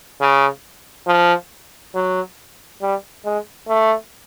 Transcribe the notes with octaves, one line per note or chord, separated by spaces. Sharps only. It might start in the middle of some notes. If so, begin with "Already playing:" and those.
C#3
F3
F#3
G3
G#3
A3